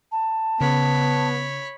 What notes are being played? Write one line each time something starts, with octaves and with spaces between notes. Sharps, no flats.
A5
C#3 B3 C#5 B5